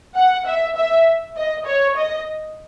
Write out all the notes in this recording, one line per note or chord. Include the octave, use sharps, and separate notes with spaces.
F#5
E5
E5
D#5
C#5
D#5